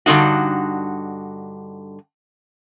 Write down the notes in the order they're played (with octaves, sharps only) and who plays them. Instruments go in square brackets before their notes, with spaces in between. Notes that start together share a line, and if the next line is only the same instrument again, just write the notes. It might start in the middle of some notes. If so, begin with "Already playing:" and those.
[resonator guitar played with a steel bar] G2 D3 D#3 A#3 D#4 F#4